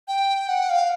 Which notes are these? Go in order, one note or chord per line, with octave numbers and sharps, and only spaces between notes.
G5
F#5
F5